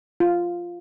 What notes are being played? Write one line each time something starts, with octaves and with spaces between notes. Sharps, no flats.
F4